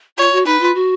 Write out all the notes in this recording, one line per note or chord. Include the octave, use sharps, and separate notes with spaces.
F4 C#5
F#4
D#4 B4
F4
F#4